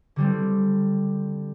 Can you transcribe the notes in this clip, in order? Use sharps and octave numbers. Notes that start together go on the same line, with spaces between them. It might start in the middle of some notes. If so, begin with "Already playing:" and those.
D3 G3 C4